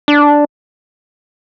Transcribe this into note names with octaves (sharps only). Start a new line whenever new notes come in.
D4